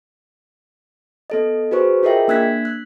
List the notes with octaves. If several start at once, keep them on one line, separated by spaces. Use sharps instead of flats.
B3 A4 D#5
F#4 G#4 B4 C5 C#6
F4 G#4 A#4 D#5 E5 G5
A#3 D4 E6 F#6 G#6 B6
F#6